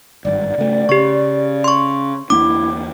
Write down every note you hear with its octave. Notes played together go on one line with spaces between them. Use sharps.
G#1 G2 D5
C#3 A3
C#3 G4 C#6
C6 C#6
E2 A#3 D4 E4 D6